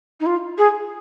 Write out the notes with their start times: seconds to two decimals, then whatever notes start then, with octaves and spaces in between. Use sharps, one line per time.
0.20 D#4
0.26 F4
0.58 G#4